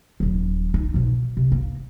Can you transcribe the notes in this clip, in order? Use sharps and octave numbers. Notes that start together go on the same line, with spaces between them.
D#1 F#3
D#4
B2 F3
C3
A#3